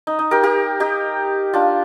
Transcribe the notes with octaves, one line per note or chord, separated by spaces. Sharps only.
D#4
D#4
G4 A#4
G4 A#4
D#4 G4
D4 F4